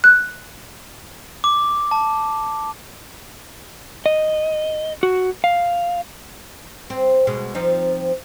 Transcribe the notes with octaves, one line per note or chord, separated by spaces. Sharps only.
F#6
D6
A5
D#5
F#4
F5
C4
B2 G#3
F3 C4 D#4